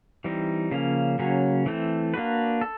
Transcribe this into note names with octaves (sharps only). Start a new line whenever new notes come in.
E3 G3 C4 D#4
C#3 F3 A#3 C#4
C#3 F#3 A#3 C#4
E3 A3 C4
A#3 D4 F#4 B4
A4